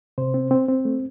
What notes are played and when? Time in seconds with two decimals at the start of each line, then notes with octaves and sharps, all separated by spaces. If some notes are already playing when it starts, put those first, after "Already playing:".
0.18 C3 C5
0.34 C4
0.51 C4
0.69 C4
0.85 A3